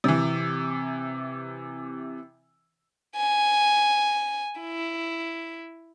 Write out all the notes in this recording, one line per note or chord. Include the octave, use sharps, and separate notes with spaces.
C3 E3
G#5
E4